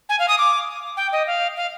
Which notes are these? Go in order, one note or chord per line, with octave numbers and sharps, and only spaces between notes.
G#5
F5
D#6
D6
G5
D#5
F5
F5